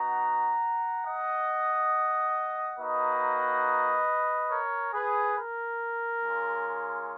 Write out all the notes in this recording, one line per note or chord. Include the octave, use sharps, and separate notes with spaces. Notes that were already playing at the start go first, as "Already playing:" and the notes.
Already playing: B3 D#4 F#4 F#5 A#5
D#5 F#5
A#3 D#4 F#4 B4 D#5
A#4 C#5
G#4 B4
A#4
G#3 C#4 F4